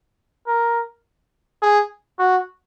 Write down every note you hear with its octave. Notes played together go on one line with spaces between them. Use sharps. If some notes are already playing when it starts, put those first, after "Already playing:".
A#4
G#4
F#4